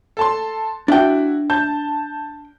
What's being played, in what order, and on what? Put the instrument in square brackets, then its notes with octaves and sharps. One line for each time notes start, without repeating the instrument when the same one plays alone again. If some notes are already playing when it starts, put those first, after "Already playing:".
[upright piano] A4 A5 C6
[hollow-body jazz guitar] D4 G5 [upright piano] E4 F#4
[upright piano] A5 G6